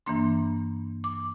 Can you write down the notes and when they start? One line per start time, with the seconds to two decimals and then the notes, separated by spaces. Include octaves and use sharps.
0.06 G2 E3 A#3 D4 C6
1.04 D6